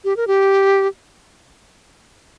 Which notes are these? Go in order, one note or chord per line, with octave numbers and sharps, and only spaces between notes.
G4
A#4
G4